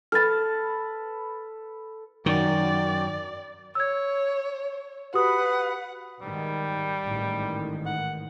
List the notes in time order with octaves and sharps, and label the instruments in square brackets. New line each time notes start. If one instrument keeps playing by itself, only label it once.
[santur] A4 B4 A5 [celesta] F6 A6
[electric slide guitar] F#2 [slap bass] D#3 [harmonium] F#4 A#4 G5 [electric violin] D5
[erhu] C#5 [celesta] E6 G#6
[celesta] F#4 G4 D#6 [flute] B4 [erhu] F#5
[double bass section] G#2 D#3 [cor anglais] G3
[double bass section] A1 G#2 D#3
[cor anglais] F#5